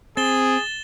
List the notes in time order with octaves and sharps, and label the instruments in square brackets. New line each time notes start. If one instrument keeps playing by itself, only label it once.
[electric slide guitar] C4 [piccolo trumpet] G#4 [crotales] A6 E7 G7